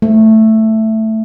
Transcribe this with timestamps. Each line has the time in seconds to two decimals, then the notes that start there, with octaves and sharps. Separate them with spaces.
0.02 A3